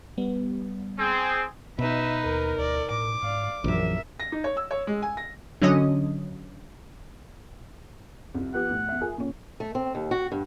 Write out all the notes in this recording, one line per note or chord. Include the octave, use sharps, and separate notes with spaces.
G3 B3
C4 G#4
B2 D#4 B4 E5
D#2 A#4
D2 D5
A2 D6
G#2 D5 F5
A#1 F#2 E3 A#4 E5
A#6
D#4
C#5
E6
C#5
G#3
G#5
A#6
D3 F#3 C#4 D#5 D#6
C2 F2
F3 B3 G4 F#5
A2
E2 E5
F4 G#4 A#4
A#2 C#4
A3
C4
D#2
F#4
G2